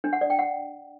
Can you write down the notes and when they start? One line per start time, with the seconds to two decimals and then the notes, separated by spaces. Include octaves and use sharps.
0.04 D4
0.13 F#5
0.21 D5
0.30 G5
0.39 F#5